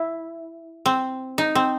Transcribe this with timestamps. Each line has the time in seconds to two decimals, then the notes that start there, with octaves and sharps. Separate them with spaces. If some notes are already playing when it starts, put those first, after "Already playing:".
Already playing: E4
0.86 C4
1.38 D#4
1.55 C4